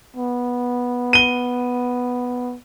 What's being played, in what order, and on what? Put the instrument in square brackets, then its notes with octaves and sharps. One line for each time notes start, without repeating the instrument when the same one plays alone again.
[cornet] B3
[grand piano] D#7 G7